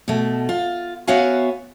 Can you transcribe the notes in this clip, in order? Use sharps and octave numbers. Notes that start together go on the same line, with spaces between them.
B2 A3
F4
B3 F#4 C#5 E5 F5 G#5